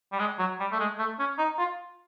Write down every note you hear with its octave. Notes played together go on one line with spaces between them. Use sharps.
G3
G#3
F#3
G3
A3
G#3
A3
C#4
D#4
F4